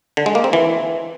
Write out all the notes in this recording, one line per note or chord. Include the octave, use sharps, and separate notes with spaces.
D3
G#3
A#3
C4
E3